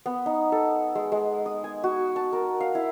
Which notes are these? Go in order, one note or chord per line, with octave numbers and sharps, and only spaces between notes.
B3
D#4
A4
G#3
G#3
D#6
G#5
F#4
A5
A#4
F5
E4